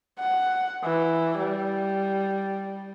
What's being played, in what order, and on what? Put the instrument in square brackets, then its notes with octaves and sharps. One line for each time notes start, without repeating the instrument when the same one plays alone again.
[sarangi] F#5
E3
G3